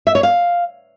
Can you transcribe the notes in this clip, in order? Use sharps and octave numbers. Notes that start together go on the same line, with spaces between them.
E5
C#5
F5